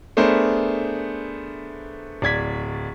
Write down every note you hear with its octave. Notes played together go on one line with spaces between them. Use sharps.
A3 B3 D4 G#4 A#4 C5
D1 D5 G#6 B6